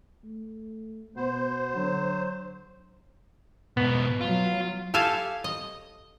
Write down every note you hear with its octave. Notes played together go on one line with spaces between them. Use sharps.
A3
B2 B3 C5
D3 F#3
G#2 B2 B3
F#3 F4
G4 A4 E5 F5 G#5
D#5